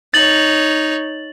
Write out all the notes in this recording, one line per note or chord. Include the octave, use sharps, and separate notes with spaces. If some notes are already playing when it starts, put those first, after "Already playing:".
D#4 C#5 A6 F#7